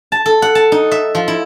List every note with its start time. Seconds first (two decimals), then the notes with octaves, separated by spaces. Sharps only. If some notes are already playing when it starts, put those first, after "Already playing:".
0.12 A5
0.26 A4
0.42 F#5
0.55 A5
0.72 D#4
0.91 E5
1.15 F3
1.28 E4